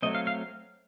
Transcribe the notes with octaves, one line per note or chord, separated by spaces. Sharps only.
F#3 A3 C4 D#5
F5
F5